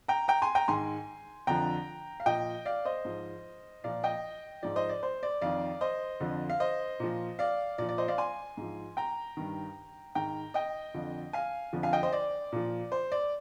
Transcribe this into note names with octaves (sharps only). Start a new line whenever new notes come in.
G5 A#5
G5 A#5
G#5 C6
G5 A#5
G#2 D#3 G#5 C6
F2 D3 F3 G5 A#5
F5
A#2 F3 D#5 G5
D5 F5
C5 D#5
G#2 F3
A#2 F3 D5 F5
D#5 G5
G#2 F3 D5
C5 D#5
D5
C5
D5
F2 D#3 D5 F5
C5 D#5
F2 D3 F3
F5
C5 D#5
A#2 F3
D5 F5
A#2 F3 D5
D5
C5 D#5
D5 F5
G#5 C6
G#2 F3
G5 A#5
G2 D#3
G#2 D#3 G5 A#5
D#5 G5
F2 D3 F3
F5 G#5
F2 D3 F3
F5 G#5
D#5 G5
C5 D#5
D5
A#2 F3
C5
D5